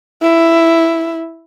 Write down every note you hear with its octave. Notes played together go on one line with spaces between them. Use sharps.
E4